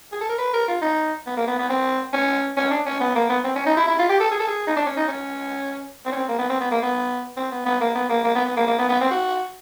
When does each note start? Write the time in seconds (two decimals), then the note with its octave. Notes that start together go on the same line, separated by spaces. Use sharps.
0.12 G#4
0.21 A4
0.29 A#4
0.38 B4
0.53 A#4
0.68 F4
0.82 D#4
1.27 B3
1.37 A#3
1.47 B3
1.59 B3
1.69 C4
2.13 C#4
2.57 C#4
2.71 D4
2.86 C#4
3.00 B3
3.15 A#3
3.29 B3
3.44 C4
3.55 C#4
3.66 D#4
3.77 E4
3.87 E4
3.99 F4
4.10 G4
4.20 A4
4.31 G#4
4.39 A4
4.48 G#4
4.67 D#4
4.76 D4
4.86 C#4
4.97 D#4
5.08 C#4
6.06 C4
6.12 C#4
6.16 C4
6.28 A#3
6.39 B3
6.50 C4
6.61 B3
6.71 A#3
6.83 B3
7.37 C4
7.52 B3
7.66 B3
7.81 A#3
7.95 B3
8.09 A#3
8.24 A#3
8.35 B3
8.46 B3
8.56 A#3
8.67 A#3
8.79 B3
8.89 B3
9.01 C4
9.11 F#4